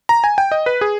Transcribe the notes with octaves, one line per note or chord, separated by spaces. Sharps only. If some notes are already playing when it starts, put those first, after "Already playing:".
A#5
G#5
G5
D#5
B4
G#4